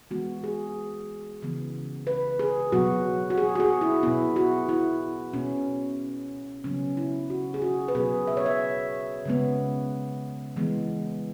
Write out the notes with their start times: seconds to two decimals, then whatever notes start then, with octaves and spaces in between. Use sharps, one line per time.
0.11 E3 G#3 B3 F#4
0.44 G#4
1.42 C#3 E3 B3
2.07 B4
2.39 G#4
2.72 B2 F#3 B3 F#4
3.30 F#4
3.38 G#4
3.55 F#4
3.60 G#4
3.81 E4
4.03 B2 B3 E4
4.36 F#4
4.69 E4
5.33 B2 B3 C#4
6.64 C#3 F#3 B3 C#4
6.97 E4
7.30 F#4
7.54 G#4
7.62 F#4
7.88 B4
7.95 B2 F#3 B3 G#4
8.27 E5
8.37 C#5
8.46 E5
9.25 C#3 G#3 B3
10.56 E3 G#3 B3